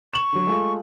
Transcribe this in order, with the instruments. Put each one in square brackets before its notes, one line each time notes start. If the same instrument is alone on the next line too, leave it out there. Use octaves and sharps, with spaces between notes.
[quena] C#6 [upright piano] E7 F#7
[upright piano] D3 F#3
G#3 A3 F4